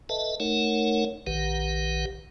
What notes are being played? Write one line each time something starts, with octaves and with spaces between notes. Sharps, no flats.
A4 B4 D#5 E5 A5
A3 D#4 A#4 C#5 F#5
A#1 D#3 G4 B4 F#5